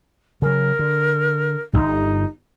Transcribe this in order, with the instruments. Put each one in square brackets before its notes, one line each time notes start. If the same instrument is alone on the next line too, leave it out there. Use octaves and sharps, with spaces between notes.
[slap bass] C#3 F#3 [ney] A#4
[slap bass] D3
[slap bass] D1 G1 [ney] D#4